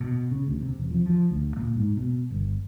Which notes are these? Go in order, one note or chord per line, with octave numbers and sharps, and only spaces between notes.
B2
C#3
D2
C3
E1
F3
F3
D2
A#2
G#2
B2
G1